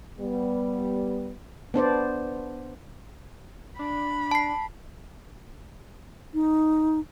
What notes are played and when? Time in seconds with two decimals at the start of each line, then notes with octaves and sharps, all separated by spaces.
0.20 G3 B3
1.74 B3 D4 C5 D5
3.79 D4 B5
4.31 A5 C7
6.34 D#4